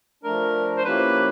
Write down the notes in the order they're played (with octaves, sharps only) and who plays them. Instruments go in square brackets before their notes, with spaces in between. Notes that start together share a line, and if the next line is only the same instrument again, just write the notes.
[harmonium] F3 A3 D4 [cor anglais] A#4
[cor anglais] C5
[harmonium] F3 A#3 C#4 E4 G4 [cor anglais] B4